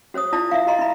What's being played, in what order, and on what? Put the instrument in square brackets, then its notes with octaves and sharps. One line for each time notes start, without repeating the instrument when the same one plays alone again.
[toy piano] F#4 C5 C#5 D#6
E4 F4 D5 A5
E5 F5
F#4 D#5 A#5 C6
E4 B5